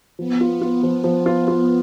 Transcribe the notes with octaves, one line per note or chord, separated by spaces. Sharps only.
F3 B3
F4
F4
F3
F3
F4
F4